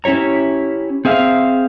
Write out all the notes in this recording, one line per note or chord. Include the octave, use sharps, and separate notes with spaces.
C#4 E4 G4 C#5 A#5
C4 G#4 E5 F5